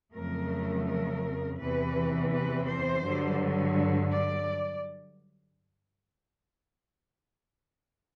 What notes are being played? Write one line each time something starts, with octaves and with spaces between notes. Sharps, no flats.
F2 C#3 F#3 A3 A#4
A#4
E2 C3 E3 B4
B4
C5
G2 D3 F#3
D5